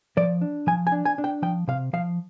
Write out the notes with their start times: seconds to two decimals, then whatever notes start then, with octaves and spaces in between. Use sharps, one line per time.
0.17 F3 D5
0.41 D4
0.67 F3 G#5
0.87 G#5
0.92 D4
1.05 G#5
1.18 D4
1.24 G5
1.42 F3 G5
1.68 C3 F5
1.93 F3 F5